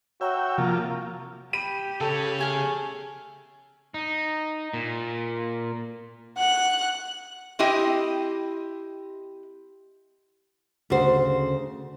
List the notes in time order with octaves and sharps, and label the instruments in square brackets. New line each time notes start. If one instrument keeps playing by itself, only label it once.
[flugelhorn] F#4 [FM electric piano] C#5 A#5 [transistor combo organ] E5 G5
[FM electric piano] C3 [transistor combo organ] F3 A#3 F4
[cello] G4 [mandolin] B5 [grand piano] D#7
[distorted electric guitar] C#3 C#5 [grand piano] A4
[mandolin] A3 G#4 F6
[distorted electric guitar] D#4
A#2
[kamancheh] F#5 F#6
[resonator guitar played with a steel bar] C4 E4 G4 D#5
[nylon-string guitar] D2 C#3 F#4 C5